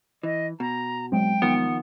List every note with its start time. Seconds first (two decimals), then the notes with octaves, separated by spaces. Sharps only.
0.23 E3 D#5
0.60 B2 A#5
1.12 F#3 G#3 C4 G5
1.42 D#3 F3 A#3 B3